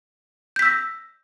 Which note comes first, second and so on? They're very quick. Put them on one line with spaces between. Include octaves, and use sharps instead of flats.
G6 B6 E6 A#6